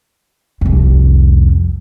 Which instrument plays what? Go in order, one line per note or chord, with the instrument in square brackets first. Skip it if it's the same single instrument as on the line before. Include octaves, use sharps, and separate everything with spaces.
[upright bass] C2 F2